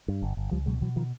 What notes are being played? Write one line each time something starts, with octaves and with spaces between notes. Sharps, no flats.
G2
G1
G1
C#2 F3 G3
B2 F#3 G#3
B2 E3 F#3
D#3 F3